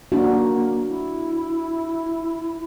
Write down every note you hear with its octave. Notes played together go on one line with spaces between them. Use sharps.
A#3 D4 F#4
E4